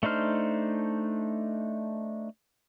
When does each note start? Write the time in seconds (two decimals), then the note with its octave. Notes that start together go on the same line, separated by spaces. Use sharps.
0.03 A3 D4 D#4 C5 F6